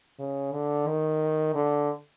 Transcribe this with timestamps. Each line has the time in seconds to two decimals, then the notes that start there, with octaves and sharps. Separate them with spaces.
0.19 C#3
0.53 D3
0.87 D#3
1.55 D3